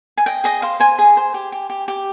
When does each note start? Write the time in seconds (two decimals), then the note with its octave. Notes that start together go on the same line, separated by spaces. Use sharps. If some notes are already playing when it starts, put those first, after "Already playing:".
0.18 G#5
0.26 D#5 G5
0.44 G#4 D#5
0.62 C5 F5
0.80 C5 G#5
0.99 G#4
1.17 C5
1.34 G4
1.52 G4
1.70 G4
1.88 G4